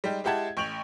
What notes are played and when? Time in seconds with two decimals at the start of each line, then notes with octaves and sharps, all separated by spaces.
0.04 G3 G#3 D#4 G4
0.24 G#3 E4 G4 F#5 A5 G#6
0.57 A1 C#6 G6 D7 F7 F#7